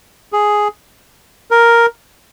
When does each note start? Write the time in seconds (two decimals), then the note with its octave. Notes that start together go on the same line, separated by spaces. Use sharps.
0.33 G#4
1.51 A#4